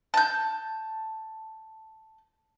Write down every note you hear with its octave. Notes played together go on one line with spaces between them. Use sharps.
A5 G6